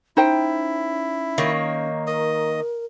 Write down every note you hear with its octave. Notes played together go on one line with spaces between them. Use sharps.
C#4 D#4 E4 C5 G5
D#3 A#3 C#5
A#4 D#5